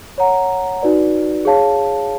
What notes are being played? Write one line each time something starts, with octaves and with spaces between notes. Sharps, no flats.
C#5 F#5 A#5
D#4 F#4 B4 D5
G#4 C#5 F5 A5